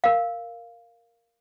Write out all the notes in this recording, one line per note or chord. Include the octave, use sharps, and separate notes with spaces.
A#4 F5